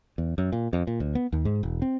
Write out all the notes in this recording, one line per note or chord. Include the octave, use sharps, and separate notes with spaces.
E2
F#2
A#2
F2
A#2
D2
B3
D#2
G#2
E1
C4